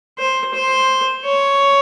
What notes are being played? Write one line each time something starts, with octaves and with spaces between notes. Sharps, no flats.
C5
C5
C#5